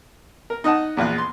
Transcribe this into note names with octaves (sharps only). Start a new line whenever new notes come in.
A#4
D#4 D#5 F#5 A5
A#1 E2 F4 F#6
C6